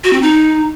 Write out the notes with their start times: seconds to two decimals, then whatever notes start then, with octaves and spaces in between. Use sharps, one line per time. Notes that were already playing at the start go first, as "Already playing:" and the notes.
0.04 F#4
0.13 C4
0.22 D#4